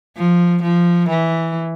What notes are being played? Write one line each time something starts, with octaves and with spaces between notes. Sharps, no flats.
F3
F3
E3